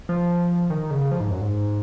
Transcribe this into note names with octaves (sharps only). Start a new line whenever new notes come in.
F3
D#3
C#3
F3
G#2
F#2
G#2